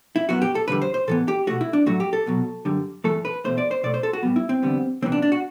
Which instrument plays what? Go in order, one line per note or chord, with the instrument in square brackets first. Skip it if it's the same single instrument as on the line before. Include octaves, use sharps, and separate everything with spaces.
[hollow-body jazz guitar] E4
F#2 F#3 B3 F#4
G4
A4
E2 D3 G3 B4
C5
C5
A2 E3 B3 A4
G4
B2 A3 F#4
E4
D4
A2 F#3 A3 F#4
G4
A4
C2 B2 F#3
F#2 D3 G3
G2 E3 A3 A4
B4
E2 B2 A3 C5
D5
C5
B2 A3 D5
C5
A4
F#4
A2 G3 B3
E4
C4
E2 D3 G3 B3
C2 C3 E3 B3 C4
D4
D4
F#4